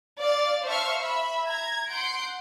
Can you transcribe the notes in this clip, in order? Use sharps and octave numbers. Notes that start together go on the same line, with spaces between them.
D5 F5 A6
C5 E5 F5 A5 C#6 F6
E5 B5
A#5 G#6
F#5 C6 G6 D7